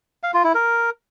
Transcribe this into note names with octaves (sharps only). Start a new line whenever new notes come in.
F5
F4
E4
A#4